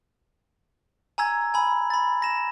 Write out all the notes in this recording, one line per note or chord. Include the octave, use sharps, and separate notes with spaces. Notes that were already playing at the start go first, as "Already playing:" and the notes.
G#5 A#5 E6 G#6
G#5 B5
B5 A6
A#6 E7